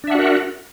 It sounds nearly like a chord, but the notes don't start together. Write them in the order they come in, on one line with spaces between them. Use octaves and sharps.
D4 E5 F#5 F#4 A#4